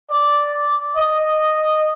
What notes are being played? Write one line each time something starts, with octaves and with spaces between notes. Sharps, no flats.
D5
D#5